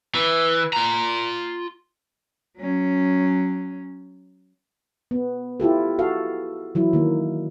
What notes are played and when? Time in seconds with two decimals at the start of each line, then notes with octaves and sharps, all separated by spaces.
0.14 E3
0.73 F4 A#5
2.58 F#3 C#4
5.11 B3
5.60 E4 F4 G4 A4
5.99 F#4 A4 F5
6.75 E3 F#3 E4
6.93 D#3 A#3